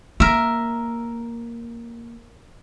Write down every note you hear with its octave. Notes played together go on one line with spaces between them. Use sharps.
A#3 A#4 E5